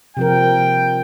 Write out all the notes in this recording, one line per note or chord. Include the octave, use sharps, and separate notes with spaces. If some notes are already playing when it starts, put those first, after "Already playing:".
C3 F3 A#4 G5